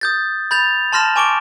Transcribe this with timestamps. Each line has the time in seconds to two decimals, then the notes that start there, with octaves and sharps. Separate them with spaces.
0.01 D#6 G6 A6
0.51 B5 G6 A6 F7
0.93 A5 C6 F6 A#6 E7
1.16 G#5 C#6 D6 D7 G7